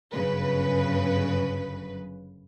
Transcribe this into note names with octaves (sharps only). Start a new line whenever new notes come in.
G1 F#2 C#3 B4